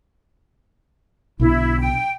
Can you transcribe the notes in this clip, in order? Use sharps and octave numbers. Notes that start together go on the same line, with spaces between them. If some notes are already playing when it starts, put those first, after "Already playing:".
B1 B2 D3 E4
G5